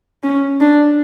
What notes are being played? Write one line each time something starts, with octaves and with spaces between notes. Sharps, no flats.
C#4
D4